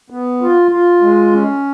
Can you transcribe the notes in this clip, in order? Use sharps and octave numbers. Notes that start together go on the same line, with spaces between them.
B3
F4
F4
G#3
C#4